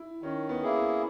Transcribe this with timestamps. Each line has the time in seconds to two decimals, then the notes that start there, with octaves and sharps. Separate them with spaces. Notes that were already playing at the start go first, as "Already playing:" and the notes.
Already playing: E4
0.22 D#3 C#4
0.49 B3
0.63 A#3 E4 G#4
0.76 B3